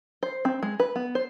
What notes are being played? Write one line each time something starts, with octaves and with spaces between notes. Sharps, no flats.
C5
C4
G#3
B4
B3
C5